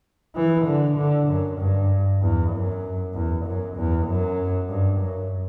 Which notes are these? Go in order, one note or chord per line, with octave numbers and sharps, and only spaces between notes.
E3
D3
D3
F#2
G2
E2
F#2
E2
F#2
E2
F#2
G2
F#2